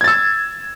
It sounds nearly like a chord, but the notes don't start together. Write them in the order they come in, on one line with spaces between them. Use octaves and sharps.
G#6 A6 E6